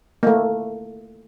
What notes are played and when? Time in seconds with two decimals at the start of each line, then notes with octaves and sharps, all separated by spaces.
0.23 A3 A#3